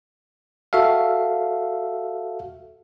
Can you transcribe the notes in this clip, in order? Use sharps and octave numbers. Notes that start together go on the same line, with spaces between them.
F#4 A4 E5 F5